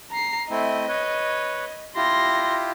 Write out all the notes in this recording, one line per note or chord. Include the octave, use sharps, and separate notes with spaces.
A#5 C7
A3 C4 E4 D#5
B4 C#5
E4 F4 G4 C6 A#6